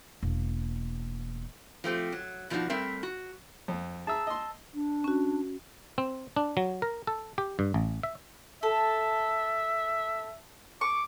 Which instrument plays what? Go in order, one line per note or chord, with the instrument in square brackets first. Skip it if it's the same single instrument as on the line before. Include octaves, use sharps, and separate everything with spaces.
[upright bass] E1 A#3
[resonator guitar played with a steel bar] F3 A3 C4 G4
F#3
B2 F3 F#3 D4 D#4 F#4
G3 A3 C4 A#4 E5
F#4
[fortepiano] F2
[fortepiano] G#4 E5 A#5 [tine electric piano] A5 E6
[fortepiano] D#5 C6
[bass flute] D4
[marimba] C#4 F#4
[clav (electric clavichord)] C4
D4
F#3
A#4
A4
G4
G2
A1
E5
[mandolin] A4 [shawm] E5
[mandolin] C#6 [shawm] D6